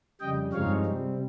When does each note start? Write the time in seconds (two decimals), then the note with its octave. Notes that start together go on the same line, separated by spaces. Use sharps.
0.20 F2 C#3 G3 D#5 G5
0.52 G2 F3 G#3 C4 D#4 C#5 F5
0.85 C3 G3 C4